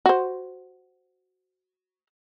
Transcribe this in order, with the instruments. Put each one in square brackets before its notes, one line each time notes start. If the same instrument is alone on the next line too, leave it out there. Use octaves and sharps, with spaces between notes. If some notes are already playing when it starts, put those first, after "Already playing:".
[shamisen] F#4 C5